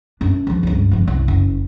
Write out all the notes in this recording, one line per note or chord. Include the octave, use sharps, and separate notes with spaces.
F#2 D4
E3 F3
C#2 G2
F#1 F3
C2
F#1